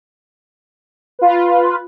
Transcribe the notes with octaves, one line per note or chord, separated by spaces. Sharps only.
F4 B4